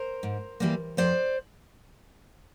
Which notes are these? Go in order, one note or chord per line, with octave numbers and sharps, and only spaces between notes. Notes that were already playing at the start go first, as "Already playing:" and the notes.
Already playing: A#4 C5
G#2
E3 G3 A#3
F2 C5 D5